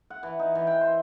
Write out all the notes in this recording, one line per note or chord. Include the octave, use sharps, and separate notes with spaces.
F#5
E3
D#4
E3
G5
C5